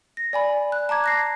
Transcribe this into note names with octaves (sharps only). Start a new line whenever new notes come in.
A#6
D5 G#5 B5
F#6
A5 A#5 D6 G#6
F#6 A#6 C7